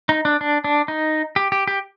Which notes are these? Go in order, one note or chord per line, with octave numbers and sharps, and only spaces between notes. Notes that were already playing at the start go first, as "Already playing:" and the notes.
D#4
D4
D4
D4
D#4
G4
G4
G4